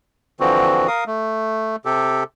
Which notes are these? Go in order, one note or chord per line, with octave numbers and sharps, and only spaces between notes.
D3 E3 F3 C4 F#4
A#4 F5 D#6
A3
C3 G4 A4